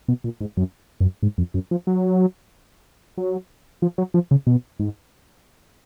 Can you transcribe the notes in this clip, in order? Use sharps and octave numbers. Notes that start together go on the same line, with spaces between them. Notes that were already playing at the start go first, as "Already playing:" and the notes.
B2
A#2
G#2
F#2
F#2
G#2
F2
F#2
F3
F#3
F#3
F3
F#3
F3
C#3
B2
G#2